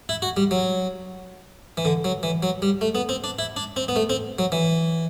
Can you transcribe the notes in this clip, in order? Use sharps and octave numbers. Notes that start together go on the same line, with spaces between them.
E4
F#4
G3
F#3
E3
D3
F#3
E3
F#3
G3
A3
B3
C4
D4
E4
D4
C4
B3
A3
C4
F#3
E3